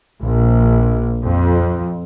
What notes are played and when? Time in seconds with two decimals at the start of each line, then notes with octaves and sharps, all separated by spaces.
0.22 A#1
1.24 F2